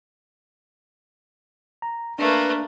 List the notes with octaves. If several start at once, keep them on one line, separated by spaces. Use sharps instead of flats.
A#5
A3 A#3 D4 B4